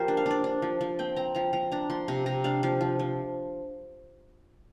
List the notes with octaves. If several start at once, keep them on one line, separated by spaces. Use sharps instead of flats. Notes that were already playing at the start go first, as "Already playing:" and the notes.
Already playing: F3 A#3 G4 A#4 C5
D4
F5
D4 D5
D4
F3
F3
C4 G5
C4 A#5
F3 A#5
F3 A#5
D4 A#5
F3 C6
C3 A#5
C3 A#5
D4 F5
F3 F5
F3
F3